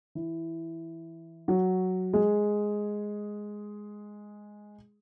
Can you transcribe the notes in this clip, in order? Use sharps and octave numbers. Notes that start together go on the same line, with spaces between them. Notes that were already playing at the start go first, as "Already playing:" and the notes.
E3 E4
F#3 F#4
G#3 G#4